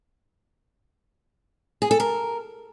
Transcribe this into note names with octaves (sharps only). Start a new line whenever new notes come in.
G#4
A4
A#4